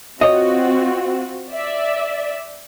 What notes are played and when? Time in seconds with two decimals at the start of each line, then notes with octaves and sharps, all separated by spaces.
0.21 C4 F4 F#4 C#5 D#5
1.51 D5 E5